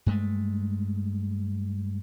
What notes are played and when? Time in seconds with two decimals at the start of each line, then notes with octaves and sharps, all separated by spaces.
0.06 G2 G#3 A3